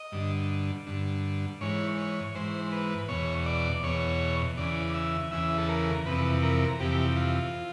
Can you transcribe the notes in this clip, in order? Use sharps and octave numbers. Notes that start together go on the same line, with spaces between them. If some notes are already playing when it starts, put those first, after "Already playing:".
Already playing: D#5
G2 D3
G2 D3
G#2 E3 C#5
C#5
G#2 E3 C5
B4
E2 B2 C#5
D5
E2 B2 C#5
E2 C#3 E3 D5
E5
E2 C#3 E3 E5
A4
A#4
F2 C3 E3 B4
A#4
F2 C3 E3 G4
F4